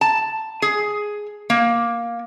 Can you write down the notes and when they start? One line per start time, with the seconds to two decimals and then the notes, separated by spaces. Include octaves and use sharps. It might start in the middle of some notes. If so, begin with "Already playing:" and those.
0.01 A5
0.62 G#4
1.50 A#3